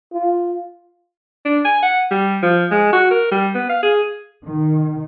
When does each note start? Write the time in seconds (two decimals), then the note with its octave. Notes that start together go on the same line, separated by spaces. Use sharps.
0.13 F4
1.45 D4
1.65 G#5
1.83 F#5
2.11 G3
2.43 F3
2.71 G#3
2.93 F#4
3.11 A#4
3.32 G3
3.55 B3
3.69 F5
3.83 G#4
4.46 D#3